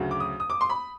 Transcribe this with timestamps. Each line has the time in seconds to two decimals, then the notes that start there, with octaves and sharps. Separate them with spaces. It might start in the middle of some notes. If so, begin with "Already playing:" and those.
Already playing: D2 C#3 F#3
0.11 D6
0.20 D#6
0.40 D#6
0.50 D6
0.61 C6
0.70 B5